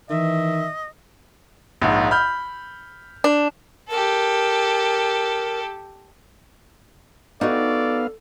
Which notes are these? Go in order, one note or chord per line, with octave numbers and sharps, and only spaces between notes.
D#3 E3 D#5 E5
A#1 G#2
B5 F6 G6
D4
G4 A4 A#4
B3 D#4 F#4 A4 D5 F5